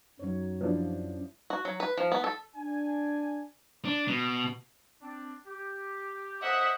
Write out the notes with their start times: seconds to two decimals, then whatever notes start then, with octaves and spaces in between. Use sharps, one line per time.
0.19 F#2 F#3 D#4 C#5
0.61 F3 D4 E4
1.50 F#4
1.65 F#3
1.80 B4
1.97 F3
2.12 B3
2.24 A4
2.56 D4 G#5
3.85 D4
4.08 B2
5.02 C4 D4
5.46 G4
6.42 A4 C5 D#5 E5 F#5